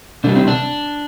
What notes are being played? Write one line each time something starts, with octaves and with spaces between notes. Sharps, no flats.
C3 G3 D4
C4
D4